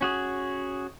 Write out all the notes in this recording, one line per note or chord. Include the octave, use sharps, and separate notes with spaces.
C#4 F#4 G#4